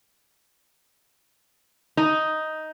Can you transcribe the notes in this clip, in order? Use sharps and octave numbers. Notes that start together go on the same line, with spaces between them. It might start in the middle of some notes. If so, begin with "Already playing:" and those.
D#4